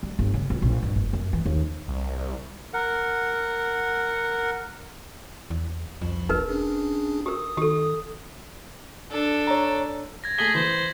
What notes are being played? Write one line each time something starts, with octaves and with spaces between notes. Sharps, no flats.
G3
G1
C#3
C#2
A#1
G2
F#1
F#2
E3
D#2
C2
A#4 F#5
E2
C2 F2 F3
E1 A#1 D#4 A#4 B4
C#4 D4 G#4
G4 A#4 D#6
D#3 G4 A4
D4 A4
C#5 A#5
G#6 A#6
A3 G#4 B6 F#7 G7
E3 C5